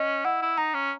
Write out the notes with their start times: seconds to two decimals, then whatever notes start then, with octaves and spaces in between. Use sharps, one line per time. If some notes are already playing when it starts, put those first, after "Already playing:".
Already playing: C#4 D#5
0.25 E4 F#5
0.42 E4
0.58 D#4 A#5
0.74 C#4